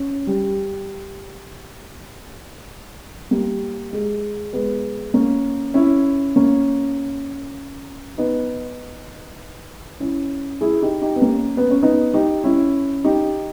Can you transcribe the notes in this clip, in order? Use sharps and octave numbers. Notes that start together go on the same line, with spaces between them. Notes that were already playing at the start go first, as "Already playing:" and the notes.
Already playing: C#4
G3
G3 A#3
G#3
G#3 B3
A#3 C#4
C#4 E4
A#3 C#4
B3 D#4
C#4 E4
E4 G#4
D#4 G4
D#4 G4
B3
A#3 C#4
B3
C#4
B3 D#4
D#4 G4
C#4 E4
D#4 G4